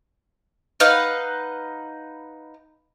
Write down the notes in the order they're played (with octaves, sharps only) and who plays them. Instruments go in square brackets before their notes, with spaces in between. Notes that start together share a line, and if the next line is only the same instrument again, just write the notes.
[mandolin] D#4 B4 F5 F#5